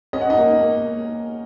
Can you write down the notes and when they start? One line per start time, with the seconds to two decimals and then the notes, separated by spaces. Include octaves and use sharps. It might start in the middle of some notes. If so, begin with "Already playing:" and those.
0.13 C#4 D#5
0.21 F#5
0.30 D#4 D#5
0.37 A#3
0.61 A#3